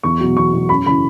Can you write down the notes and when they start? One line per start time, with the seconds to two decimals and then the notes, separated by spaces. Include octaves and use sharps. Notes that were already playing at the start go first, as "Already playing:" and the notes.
0.03 E2 C#6
0.20 B2 F#3
0.37 E2 C#6
0.53 B2 F#3
0.69 F#2 B5
0.86 C#3 E3 B5